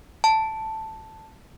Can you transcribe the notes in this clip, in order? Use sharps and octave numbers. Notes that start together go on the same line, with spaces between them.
A5